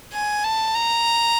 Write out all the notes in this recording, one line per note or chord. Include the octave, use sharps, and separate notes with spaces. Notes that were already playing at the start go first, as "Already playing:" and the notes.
G#5
A5
A#5